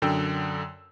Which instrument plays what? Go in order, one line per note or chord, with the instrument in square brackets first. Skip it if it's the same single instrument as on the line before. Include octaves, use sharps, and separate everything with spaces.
[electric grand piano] F#2 D3 G5 E6